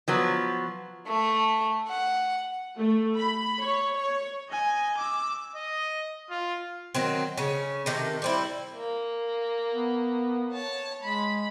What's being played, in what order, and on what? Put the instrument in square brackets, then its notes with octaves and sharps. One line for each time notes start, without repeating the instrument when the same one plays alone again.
[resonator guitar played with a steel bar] F3 F#3 B3
[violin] A3
F#5
[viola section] A3
B5
C#5
C#5
[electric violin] D#5 G#5
D6 E6
[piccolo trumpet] D#5
F4
[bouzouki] D#3 F#3 C4
C#3 C#4
C3 D#3 A4
G3 C4 E4
[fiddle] A#3
[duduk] B3
[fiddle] C#5 A5
[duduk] G#3 [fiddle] B5